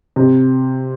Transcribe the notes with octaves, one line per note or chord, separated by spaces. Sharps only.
C3